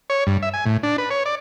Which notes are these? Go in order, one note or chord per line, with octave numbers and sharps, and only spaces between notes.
C#5
G2
E5
G#5
A2
D4
B4
C#5
D5